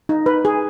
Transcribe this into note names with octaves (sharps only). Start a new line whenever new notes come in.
D#4
B4
G#4